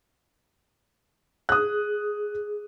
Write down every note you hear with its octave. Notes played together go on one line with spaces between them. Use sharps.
G#4 D#6 F#6